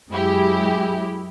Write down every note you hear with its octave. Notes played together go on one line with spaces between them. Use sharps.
F#2 G#3 E4 G4